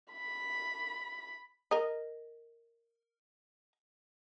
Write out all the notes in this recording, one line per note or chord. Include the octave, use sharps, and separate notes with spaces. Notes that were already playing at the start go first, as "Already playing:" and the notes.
B5
A#4 D#5